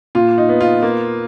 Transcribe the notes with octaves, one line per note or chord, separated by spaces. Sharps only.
A#2 F4
D#4
B3
F4
A#3